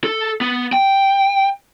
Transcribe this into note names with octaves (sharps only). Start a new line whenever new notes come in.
A4
B3
G5